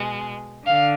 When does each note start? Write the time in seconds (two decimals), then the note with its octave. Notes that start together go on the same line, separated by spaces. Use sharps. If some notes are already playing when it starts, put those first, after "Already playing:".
Already playing: B2 G#3
0.66 D3 F5